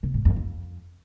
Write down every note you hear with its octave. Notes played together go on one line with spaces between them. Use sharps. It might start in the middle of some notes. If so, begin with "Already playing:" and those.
C3
G#2
F2
F2